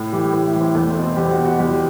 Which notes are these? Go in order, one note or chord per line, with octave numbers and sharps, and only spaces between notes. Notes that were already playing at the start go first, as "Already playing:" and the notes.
Already playing: A2
E3 G4
A2
E4
E3
C4
E2 A3
C4
B2
C4
E2 G4
F#4
B2
F#4
E2 G4